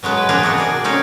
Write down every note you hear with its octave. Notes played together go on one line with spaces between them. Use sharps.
B2 F#3 G#3 B3
B4
B2 F3 D4 D#4 G#4
C3 F3 A#3 F#4
G#4 D5
C4 C#4 D#4 D5